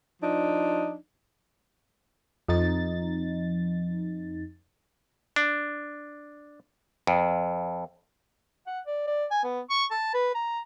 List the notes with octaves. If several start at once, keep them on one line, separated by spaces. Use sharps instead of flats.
F3 D4 D#4
F2 D#4 A6
D4
F2
F#5
D5
D5
G#5
B3
C#6
A5
B4
A#5